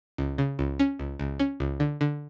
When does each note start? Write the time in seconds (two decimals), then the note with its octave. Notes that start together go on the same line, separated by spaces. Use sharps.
0.18 C#2
0.38 C#3
0.59 C#2
0.79 C#4
0.99 C#2
1.19 C#2
1.39 C#4
1.60 C#2
1.80 D3
2.01 D3